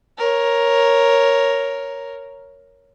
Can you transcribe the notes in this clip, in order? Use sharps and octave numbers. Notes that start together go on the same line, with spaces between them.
A#4 C#5